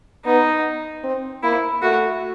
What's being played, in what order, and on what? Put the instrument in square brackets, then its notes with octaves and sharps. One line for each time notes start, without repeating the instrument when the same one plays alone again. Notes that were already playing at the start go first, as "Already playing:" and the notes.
[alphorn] B3 [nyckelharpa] D#4
[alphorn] C4
[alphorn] A#3 [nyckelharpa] E4
[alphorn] A3 [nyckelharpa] F#4